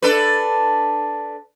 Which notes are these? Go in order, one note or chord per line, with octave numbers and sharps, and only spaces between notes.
D4 A4 B4